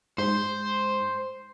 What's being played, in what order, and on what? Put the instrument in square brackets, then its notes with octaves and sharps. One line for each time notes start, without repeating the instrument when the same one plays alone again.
[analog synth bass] G#2 [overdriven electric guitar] C5